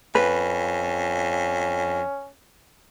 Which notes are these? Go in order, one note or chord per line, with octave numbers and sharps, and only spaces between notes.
F2 C#4 B4